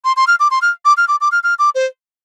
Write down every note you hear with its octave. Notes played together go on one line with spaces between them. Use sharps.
C6
C6
F6
D6
C6
F6
D6
F6
D6
D6
F6
F6
D6
C5